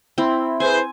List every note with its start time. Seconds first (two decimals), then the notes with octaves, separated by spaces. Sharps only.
0.18 C4 E4
0.60 G#4 B4 C5 G#5